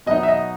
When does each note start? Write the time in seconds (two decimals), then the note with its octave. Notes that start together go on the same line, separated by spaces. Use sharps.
0.06 B2 F#3 B3 D#4 D#5
0.23 E5
0.28 D#5